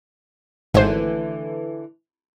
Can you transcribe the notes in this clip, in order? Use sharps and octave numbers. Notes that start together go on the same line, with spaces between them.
G#1 D3 E3 A3 C5